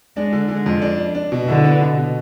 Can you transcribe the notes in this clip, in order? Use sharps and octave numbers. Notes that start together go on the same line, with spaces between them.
G#3 D4
D3
D3 G#3
F2
D4
D4
D4
B2
D3 E4
B3
B2
B2